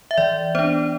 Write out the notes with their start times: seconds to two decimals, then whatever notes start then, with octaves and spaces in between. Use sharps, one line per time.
0.11 E5
0.18 E3 D5
0.55 B3 D4 C5